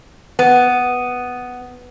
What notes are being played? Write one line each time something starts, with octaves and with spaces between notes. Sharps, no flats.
B3